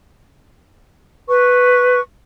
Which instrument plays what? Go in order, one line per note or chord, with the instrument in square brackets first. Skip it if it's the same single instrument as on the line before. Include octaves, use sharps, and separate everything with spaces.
[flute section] B4 C#6